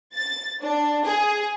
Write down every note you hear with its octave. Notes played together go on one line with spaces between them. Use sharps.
A6
D4
G#4